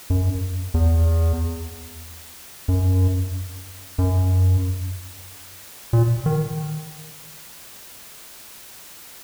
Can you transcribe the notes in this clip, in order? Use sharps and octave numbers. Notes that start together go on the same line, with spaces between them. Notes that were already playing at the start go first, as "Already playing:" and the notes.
F#2
E2
F#2
F#2
A#2
D#3